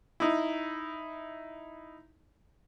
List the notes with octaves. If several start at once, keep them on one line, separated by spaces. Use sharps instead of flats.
D#4 E4